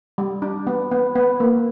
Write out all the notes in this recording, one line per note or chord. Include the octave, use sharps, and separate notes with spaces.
G3
D4
B3
B3
B3
A#3